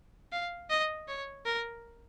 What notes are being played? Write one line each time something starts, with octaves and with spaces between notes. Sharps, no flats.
F5
D#5
C#5
A#4